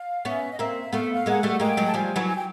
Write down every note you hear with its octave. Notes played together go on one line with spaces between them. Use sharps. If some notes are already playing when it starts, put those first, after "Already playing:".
Already playing: F5
B3 C#4 E5
D#5
A#3 C4 E5
A3 B3 F5
E5
F5
G#3 A#3 F#5
G3 A3
G#3 A#3 G5
F#3 G#3
A5
F3 G3 G#5
E3 F#3
G#5
G5